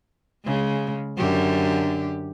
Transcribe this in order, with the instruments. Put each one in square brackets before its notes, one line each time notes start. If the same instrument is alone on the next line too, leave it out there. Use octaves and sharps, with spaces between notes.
[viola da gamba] C#3 G#3
F#2 D3 G4